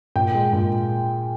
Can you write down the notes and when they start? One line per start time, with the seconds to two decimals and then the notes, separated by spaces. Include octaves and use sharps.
0.16 A#2 G5
0.34 G#3
0.53 A#2